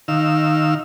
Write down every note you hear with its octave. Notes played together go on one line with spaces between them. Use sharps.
D#3 F5 E6